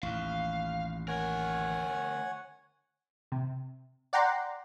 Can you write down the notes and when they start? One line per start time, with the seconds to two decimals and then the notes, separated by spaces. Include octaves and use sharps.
0.03 A1 D#2 F5
1.08 D2 A#4 C#5 F#5 G#5
3.32 C3
4.13 D5 F#5 G5 A#5 C6